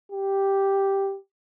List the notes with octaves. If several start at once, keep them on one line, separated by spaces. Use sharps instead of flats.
G4